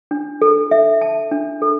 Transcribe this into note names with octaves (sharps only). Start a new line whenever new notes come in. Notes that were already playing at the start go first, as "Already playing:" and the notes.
D4
A4
E5
A5
D4
A4